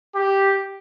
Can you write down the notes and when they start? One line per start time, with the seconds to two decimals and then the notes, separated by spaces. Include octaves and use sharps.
0.15 G4